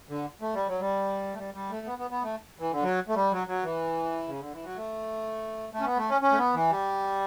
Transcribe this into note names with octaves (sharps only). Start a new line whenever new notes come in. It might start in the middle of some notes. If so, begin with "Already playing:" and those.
D3
A3
G3
F#3
G3
A3
G3
G3
A3
B3
B3
B3
A3
E3
D3
F#3
A3
G3
F#3
F#3
E3
C#3
D3
E3
F#3
A3
A3
C#4
B3
A3
C#4
C#4
A3
B3
E3
G3